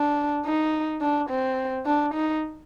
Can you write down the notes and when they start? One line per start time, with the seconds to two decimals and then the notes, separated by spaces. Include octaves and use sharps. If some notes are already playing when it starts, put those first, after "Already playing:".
Already playing: D4
0.45 D#4
1.01 D4
1.30 C4
1.86 D4
2.14 D#4